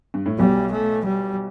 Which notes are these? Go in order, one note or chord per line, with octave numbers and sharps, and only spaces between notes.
G2
A2
B1 B2 G3
A3
G3